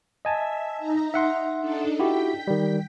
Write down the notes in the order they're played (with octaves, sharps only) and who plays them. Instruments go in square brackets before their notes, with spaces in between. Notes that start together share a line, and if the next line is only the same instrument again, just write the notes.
[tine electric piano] D#5 G#5 A5 [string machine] E5
[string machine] D#4 A#5
[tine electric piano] E5 F#5 C6
[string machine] D4 D#4 A4
[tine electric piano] E4 F#4 G4 [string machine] G5 B6
[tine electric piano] D#3 G3